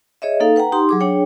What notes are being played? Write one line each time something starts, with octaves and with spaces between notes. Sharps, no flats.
G#4 C#5 D#5 E5
A#3 D#4 A4 F5
B4 F#5 G5 A#5
D#4 G4 C6
F#3 G#4 D6
D4 G#4 C#5 G5